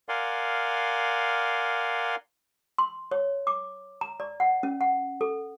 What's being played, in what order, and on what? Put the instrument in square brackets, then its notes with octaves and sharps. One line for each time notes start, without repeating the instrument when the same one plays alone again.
[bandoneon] A#4 D5 F5 F#5 G#5 C6
[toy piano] C6
C#5
D6
A#5
D5
F#5
C#4
F#5
A4